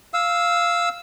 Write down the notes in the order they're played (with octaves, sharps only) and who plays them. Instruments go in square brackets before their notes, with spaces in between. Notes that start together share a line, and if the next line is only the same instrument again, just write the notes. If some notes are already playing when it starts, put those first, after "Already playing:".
[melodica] F5 E6